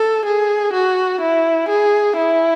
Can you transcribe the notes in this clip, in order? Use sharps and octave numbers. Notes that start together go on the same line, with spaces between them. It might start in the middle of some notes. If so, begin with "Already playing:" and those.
Already playing: A4
G#4
F#4
E4
G#4
E4